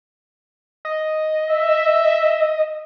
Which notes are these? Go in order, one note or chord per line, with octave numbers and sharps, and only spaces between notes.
D#5
E5